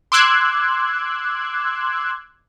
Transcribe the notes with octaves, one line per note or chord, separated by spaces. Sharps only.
C6 D6 E6 F#6 G#6